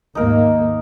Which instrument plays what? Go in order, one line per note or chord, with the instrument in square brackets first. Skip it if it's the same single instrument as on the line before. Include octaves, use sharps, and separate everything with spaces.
[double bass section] D#2 G#2 A#3 [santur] D#4 A#4